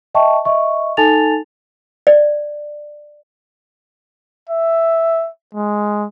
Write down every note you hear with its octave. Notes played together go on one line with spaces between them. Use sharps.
D#5 E5 G5 A5 C#6
D#5 E5 C#6
D#4 A4 G#5 A5 A6 F7
D5
E5
G#3